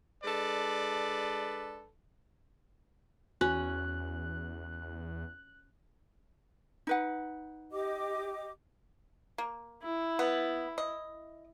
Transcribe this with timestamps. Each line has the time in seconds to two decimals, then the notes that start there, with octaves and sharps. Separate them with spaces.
0.23 G#3 D4 A4 B4 D5
3.41 E2 C#4 F#4 F#6
6.87 D#4 B4 F#5
7.72 G4 D#5 D6
9.38 A#3
9.83 E4
10.19 B3
10.78 D#5